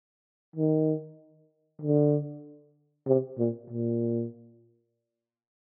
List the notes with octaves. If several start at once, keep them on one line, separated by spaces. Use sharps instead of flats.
D#3
D3
C3
A#2
A#2